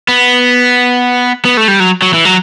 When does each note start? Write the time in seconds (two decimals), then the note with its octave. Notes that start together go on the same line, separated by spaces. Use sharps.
0.08 B3
1.45 B3
1.57 A3
1.68 G3
1.80 F#3
2.02 F#3
2.14 E3
2.25 F#3